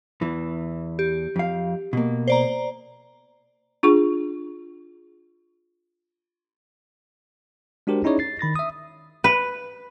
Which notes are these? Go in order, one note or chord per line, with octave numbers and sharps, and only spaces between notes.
E2 E3
G4
F2 F5
B2 A#3
C5 D5 A#5
D4 F4 G#4 C#6
G#3 D4 F#4 G4 A#4 C5
C#4 D#4 E4 G#4 C#5 D5
A6 C7
D#3 B5 A6 A#6
E5 D#6
B4